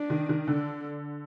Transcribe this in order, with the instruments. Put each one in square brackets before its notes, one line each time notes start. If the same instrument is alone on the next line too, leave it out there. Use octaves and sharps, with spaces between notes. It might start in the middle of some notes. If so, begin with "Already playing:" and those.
Already playing: [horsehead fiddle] D4
[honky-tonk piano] D#3
D#3
[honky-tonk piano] D3 [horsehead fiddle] D4